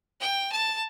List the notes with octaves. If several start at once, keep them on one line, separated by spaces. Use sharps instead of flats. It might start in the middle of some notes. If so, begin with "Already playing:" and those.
G5
A5